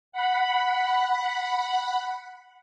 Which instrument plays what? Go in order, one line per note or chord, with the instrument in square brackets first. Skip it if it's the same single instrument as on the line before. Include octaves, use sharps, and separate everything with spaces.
[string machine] F#5 B5